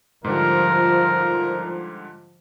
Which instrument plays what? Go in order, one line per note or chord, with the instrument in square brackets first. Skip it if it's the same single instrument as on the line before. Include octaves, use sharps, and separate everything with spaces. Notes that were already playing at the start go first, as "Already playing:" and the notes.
[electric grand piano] G#2 D3 G3 [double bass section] F3 [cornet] A#4